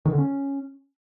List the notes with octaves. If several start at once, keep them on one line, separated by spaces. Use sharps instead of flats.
D#3
D3
C#4